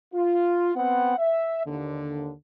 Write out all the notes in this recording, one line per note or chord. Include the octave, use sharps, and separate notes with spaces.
F4
B3 C4 F#5
E5
D#2 D3